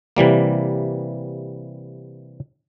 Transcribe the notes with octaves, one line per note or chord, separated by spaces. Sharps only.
C3 E3 G3 A#3